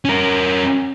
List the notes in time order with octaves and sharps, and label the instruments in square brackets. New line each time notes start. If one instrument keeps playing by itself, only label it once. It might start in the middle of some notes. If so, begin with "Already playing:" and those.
[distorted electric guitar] C#4 A#4